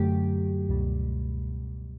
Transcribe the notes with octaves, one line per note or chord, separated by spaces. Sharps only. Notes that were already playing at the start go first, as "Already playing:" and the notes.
Already playing: F#2 D3 F#3 A3 G4
C#2 B2 G3